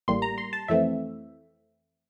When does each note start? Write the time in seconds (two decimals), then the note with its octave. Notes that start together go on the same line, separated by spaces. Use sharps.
0.08 A1 A2 G3 A#3 C6
0.22 A#5
0.38 C6
0.53 A5
0.68 F2 E3 A3 C4 E5